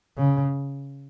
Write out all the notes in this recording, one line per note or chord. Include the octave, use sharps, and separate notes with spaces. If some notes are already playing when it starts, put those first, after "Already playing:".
C#3